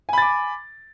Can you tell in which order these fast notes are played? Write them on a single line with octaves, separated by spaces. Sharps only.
G#5 B5 A6 D6